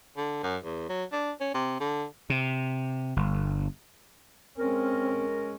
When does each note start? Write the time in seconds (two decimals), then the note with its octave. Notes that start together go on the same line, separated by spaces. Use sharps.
0.17 D3
0.43 F#2
0.64 E2
0.89 F#3
1.12 D4
1.40 C#4
1.54 C3
1.80 D3
2.30 C3
3.16 G1
4.58 G#3 C4 C#4 A#4